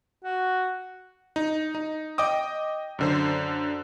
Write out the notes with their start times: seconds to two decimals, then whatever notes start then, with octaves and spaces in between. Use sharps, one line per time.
0.25 F#4
1.36 D#4
1.75 D#4
2.18 D#5 G5 D6 D#6
2.99 F#2 D3 C5